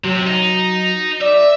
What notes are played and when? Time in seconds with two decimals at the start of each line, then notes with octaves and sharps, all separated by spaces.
0.04 C3 F#3
0.27 D#4
1.21 D5 E5